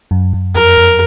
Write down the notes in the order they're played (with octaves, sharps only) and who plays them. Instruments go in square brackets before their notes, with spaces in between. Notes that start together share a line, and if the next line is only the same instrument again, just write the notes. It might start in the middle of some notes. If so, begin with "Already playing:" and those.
[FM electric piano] F#2
F#2
[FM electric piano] F2 [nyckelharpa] A#4
[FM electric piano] F2